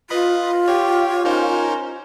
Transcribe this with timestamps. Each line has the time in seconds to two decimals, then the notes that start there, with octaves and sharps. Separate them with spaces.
0.10 F4 B4 D#5 B5
0.68 G4 C#5
1.25 C#4 D#4 A#4 C5